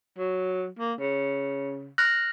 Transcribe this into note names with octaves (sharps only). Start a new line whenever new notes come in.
F#3
A#3
C#3
F6 F#6 A#6